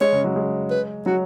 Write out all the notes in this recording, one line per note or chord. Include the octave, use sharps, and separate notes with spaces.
G#3 C#5
C#3
F#3
G#3
B4
F#3 F#4